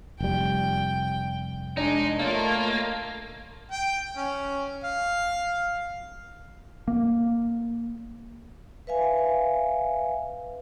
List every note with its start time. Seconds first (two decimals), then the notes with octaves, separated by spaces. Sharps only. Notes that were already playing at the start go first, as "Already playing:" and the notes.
0.20 F1 G3 G5
1.77 G#3 D4 D#4
2.19 A3 A#3 F4 C#5 D#5 A6
3.71 G5
4.17 C#4
4.84 F5
6.88 A#3
8.87 B4 E5 F5 G#5